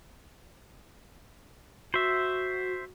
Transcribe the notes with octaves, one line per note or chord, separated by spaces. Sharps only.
F#4 C5 E5